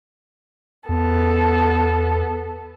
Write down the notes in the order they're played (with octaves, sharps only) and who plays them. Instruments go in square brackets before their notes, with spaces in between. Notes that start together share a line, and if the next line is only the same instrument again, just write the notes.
[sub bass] E2 [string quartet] B3 A4